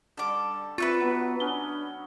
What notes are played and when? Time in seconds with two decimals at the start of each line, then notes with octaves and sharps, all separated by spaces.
0.17 D3 G3 A4 D6
0.78 C4 F4 B4 E5 C#6
1.00 F#3 B3
1.40 B3 C#4 D4 G7